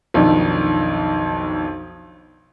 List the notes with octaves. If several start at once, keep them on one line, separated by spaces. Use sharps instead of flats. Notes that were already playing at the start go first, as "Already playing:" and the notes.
B1 F2 D#3 D4